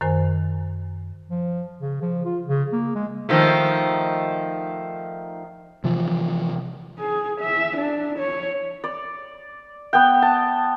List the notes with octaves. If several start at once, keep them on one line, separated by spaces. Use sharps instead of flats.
F#2 D#3 A#4 C5 G#5
F3
C#3
F3
F4
C#3
A#3
G#3
D#3 F3 A3
C3 E3 F3
G#4
E5
D4
C#5
D5
B3 G5
A5